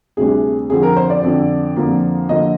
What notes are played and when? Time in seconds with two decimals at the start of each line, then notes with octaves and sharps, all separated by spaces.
0.17 D2 C3 G3 D4 G#4
0.70 F2 D3 F3 G#4
0.83 A#4
0.96 C5
1.10 D5
1.23 F2 D3 F3
1.77 F2 D3 F3 A#3
2.29 D3 F3 A#3 D#5